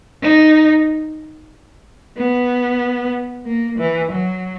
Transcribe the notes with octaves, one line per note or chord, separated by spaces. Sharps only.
D#4
B3
A#3
E3
F#3